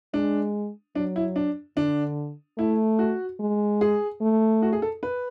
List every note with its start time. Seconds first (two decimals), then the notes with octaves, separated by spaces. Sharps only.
0.14 G#3 D4
0.95 F#3 D4
1.16 E4
1.36 D4
1.77 D3 D4
2.58 A3 E4
2.99 F#4
3.40 G#3
3.81 G#4
4.21 A3
4.62 F#4
4.73 G#4
4.82 A4
5.03 B4